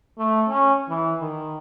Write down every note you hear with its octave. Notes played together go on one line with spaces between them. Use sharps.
A3
C#4
E3
D#3